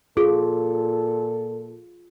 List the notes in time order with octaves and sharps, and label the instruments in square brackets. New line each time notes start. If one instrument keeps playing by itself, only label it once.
[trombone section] A#2 A4 [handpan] F4 [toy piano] G#4